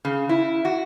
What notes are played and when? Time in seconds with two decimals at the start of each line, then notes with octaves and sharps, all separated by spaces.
0.05 C#3
0.29 E4
0.65 F#4